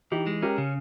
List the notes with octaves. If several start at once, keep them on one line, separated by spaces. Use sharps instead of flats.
E3 D#4 G4
G#3
C#4 G4 A#4
C#3